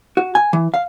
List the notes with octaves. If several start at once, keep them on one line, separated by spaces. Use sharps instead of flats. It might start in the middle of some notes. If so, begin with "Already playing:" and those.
F#4
G#5
E3
F5